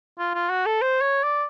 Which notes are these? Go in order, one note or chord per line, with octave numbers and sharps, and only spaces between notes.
F4
F4
F#4
A4
C5
C#5
D5